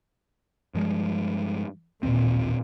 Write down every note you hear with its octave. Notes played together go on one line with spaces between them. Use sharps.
G2 F3 G#3
A1 D#2 A#2 C4